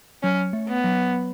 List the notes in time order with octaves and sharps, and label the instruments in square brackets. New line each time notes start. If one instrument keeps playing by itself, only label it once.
[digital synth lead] F#3 [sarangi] C#4
[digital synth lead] A3
[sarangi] B3
[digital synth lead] F#3